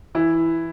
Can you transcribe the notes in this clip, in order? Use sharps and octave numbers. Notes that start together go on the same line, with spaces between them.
E3 E4